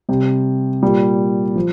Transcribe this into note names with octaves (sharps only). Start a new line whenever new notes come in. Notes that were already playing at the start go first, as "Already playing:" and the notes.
C3 G3
A#2 G3
F3